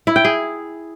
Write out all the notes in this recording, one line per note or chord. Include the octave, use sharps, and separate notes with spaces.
E4
G5
G#4